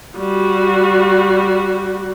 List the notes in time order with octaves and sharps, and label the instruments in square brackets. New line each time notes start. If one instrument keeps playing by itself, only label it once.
[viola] G3 F#4